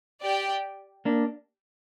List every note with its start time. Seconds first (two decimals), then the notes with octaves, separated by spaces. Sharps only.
0.22 G4 D5 G5
1.05 A#3 D4